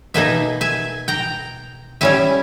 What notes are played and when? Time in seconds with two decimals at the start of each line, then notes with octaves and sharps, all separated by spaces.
0.14 B2 A#3 D#4 E5 G#5
0.61 E5 G#5
1.08 G5 A#5
2.01 G3 C#4 E4 E5 G#5